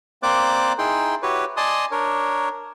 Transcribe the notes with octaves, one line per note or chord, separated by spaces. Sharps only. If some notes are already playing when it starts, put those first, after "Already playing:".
A#3 C4 C5 D5 D6 F#6
D#4 E4 G#4 G5 C6
E4 F#4 G4 B4 C#5
D5 D#5 G#5 A5 C6 D#6
D4 A#4 C#5